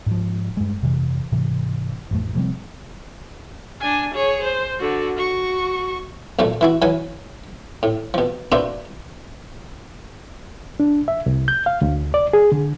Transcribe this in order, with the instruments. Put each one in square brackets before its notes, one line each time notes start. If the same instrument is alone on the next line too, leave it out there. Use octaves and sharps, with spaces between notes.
[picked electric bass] G#2 F3
G2 G#3
F2 C3 E3
G#2 C3 E3
A1 F2 A3
C3 F3 G3 C4
[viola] D4 G#5
G#4 C#5
C5
D3 F#4
F#4 C#6
[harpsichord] B1 A#2 F3 A3
E3 E4 F#4
E3 F#3 B4 G#5
A2
B2 F3
A#3 B3 D4 F#4 C5 E5
[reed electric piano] D4
E5
C2
G6
F5
D2
D5
G#4
D3